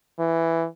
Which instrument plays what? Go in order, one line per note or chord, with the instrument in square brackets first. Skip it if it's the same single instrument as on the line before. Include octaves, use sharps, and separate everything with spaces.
[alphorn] E3